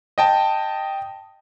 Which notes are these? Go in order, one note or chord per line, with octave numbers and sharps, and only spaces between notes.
D#5 G5 A5